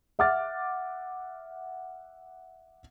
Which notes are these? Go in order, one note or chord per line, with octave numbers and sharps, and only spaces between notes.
E5 F#5 D6 F6 A6